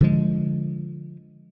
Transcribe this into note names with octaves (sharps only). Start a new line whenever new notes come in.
D3 F3 G#3